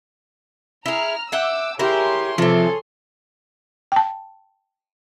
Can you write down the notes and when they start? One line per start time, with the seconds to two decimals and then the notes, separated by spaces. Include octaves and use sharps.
0.86 E4 G#4 A#5 F6
1.32 E5 F#5 G5 D6 E6
1.79 E4 G4 G#4 A#4 C#5 C6
2.38 C3 E3 F3 A4
3.92 G5 A5